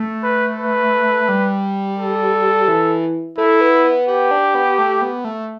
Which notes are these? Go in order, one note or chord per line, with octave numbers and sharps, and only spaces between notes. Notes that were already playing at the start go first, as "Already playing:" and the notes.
Already playing: A3
B4
B4
G3
A4
E3
A3 E4
B3
B3
B3 G4
D4
B3
A3
B3
A3